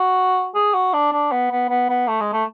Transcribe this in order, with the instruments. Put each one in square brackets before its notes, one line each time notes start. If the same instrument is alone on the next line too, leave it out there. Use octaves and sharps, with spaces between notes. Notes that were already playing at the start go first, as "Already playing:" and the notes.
Already playing: [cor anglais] F#4
G#4
F#4
D4
D4
B3
B3
B3
B3
A3
G#3
A3